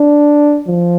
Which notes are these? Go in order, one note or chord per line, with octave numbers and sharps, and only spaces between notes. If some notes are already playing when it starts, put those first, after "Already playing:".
Already playing: D4
F3